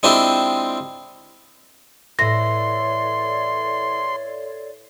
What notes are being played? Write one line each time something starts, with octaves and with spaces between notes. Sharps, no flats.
G#3 C4 D4 E4 F4 G4
A2 E3 A4 C#5 D5 C6 A#6